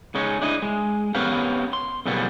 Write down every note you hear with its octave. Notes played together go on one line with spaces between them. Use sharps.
C#3 G#3 C#4 D#4
D4 E4 D#5
G#3
B3 C#4 G4 A#4 B4 F5
C6
B1 C#3 F3 G3 A#3 B3